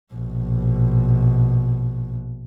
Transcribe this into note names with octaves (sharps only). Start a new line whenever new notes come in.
A#1 B2